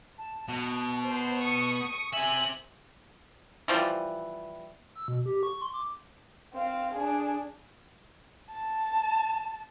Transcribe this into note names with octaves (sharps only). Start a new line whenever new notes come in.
A5
B2 A5
C5
C#6 D#6
C4 E5 G#5 F#7
E3 F3 G3
E6
B2
G4
C#6
C6
D6
C4 F5
D4 G#4
A5